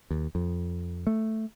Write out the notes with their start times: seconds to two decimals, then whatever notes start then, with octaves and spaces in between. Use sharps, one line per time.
0.11 D#2
0.35 F2
1.07 A3